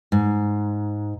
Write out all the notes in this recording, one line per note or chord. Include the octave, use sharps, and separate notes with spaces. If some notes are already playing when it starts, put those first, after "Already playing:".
G#2